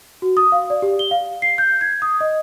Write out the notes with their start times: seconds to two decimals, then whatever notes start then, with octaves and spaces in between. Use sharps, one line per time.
0.22 F#4
0.37 D#6
0.52 F5
0.70 D5
0.82 G4
0.99 G7
1.11 F5
1.42 C7
1.58 G6
1.81 G#6
2.02 D#6
2.21 D#5